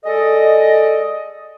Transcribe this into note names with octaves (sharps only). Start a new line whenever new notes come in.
G#3 A4 D5 D#5